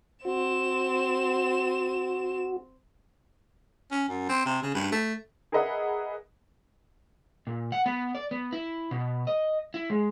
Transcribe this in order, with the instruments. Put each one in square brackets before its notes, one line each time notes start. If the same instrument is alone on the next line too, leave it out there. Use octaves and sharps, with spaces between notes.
[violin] C4 E7 [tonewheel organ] F#4
[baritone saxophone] C#4
F#2
C4
C3
C#3
G2
A3
[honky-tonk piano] G#4 A#4 B4 D#5 E5 F#5
[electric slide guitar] A#2
F#5
B3
D5
B3
E4
B2
D#5
E4
G#3